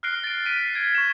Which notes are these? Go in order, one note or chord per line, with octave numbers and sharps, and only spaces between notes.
F6 F#6 A#6 C7 D7 G7
A6 D7
F#6 B6 D7 D#7
G#6 D7
C#6 E7